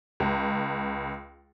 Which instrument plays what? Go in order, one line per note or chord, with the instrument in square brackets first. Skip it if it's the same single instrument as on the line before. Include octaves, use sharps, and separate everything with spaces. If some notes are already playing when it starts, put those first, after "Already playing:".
[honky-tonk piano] C#2